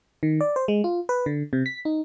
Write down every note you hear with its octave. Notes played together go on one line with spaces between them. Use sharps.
D#3
D5
C5
G#3
F4
B4
D3
C3
B6
D#4